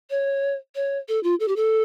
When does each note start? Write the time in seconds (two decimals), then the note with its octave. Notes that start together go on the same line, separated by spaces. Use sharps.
0.10 C#5
0.76 C#5
1.08 A4
1.24 F4
1.40 A4
1.48 G4
1.56 A4